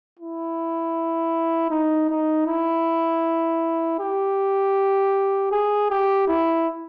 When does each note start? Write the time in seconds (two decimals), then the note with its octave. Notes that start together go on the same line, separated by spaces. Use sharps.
0.19 E4
1.70 D#4
2.09 D#4
2.47 E4
3.99 G4
5.52 G#4
5.90 G4
6.28 E4